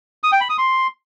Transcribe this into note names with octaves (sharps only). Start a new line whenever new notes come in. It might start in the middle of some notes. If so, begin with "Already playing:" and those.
D#6
G5
B5
D#6
C6